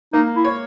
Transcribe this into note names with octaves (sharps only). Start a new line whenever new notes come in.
A#3 D#4
E4
C#5